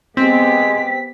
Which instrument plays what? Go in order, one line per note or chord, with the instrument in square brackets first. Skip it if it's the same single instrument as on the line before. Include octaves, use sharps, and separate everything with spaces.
[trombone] G#3 [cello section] B3 G4 [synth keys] C4 [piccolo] B6